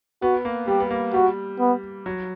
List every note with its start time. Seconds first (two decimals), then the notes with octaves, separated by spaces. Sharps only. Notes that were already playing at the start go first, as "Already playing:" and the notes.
0.22 B3 F#4
0.45 A#3
0.68 G3 G4
0.80 B3
0.90 A#3
1.14 G3 F#4
1.59 B3
2.06 F#3